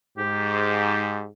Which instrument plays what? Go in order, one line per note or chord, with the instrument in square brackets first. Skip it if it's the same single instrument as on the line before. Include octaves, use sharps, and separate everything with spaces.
[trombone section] G#2 [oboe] G4